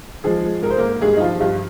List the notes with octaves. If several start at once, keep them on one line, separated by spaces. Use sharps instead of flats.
F3 G#3 G#4
G#3
G#2 A#4
C5
G#2 A#3 A#4
G2 G#3 G#4
D#4
F3 F4
G2 F4